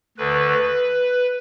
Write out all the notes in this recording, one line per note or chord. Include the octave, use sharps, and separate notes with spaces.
D2 D3 B4